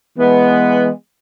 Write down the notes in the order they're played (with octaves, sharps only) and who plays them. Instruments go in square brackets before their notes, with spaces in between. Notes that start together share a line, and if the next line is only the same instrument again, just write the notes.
[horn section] E3 G#3 B3